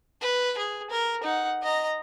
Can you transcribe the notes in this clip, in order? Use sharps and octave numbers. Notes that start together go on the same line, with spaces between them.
B4
G#4
A#4
D#4 F#5
D#5 A#5